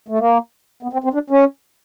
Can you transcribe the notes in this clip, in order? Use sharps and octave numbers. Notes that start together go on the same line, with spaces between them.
A3
A#3
B3
C4
C4
D4
C#4